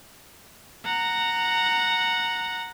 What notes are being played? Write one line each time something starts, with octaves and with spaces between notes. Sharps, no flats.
F#5 A#5